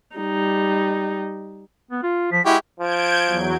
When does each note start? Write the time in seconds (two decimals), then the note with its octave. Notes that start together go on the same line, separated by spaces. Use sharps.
0.16 G3 D#4
1.91 B3
2.03 F4
2.32 F3 B6
2.46 G#3 E4 F#4 G4 E5
2.80 F3 G6 G#6 D7
3.26 E2 F#3